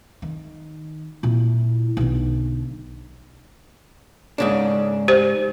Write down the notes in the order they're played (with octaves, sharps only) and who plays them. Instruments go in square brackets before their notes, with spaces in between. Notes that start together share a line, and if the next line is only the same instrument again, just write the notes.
[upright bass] D#3
A#2 E4
B1 D3
[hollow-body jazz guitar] G#2 C#3 D4
[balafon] G4 C5